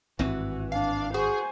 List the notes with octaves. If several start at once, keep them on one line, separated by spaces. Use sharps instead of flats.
G#1 G2 E3 C4 F#4
D4 F5
F#4 G#4 C5 G#5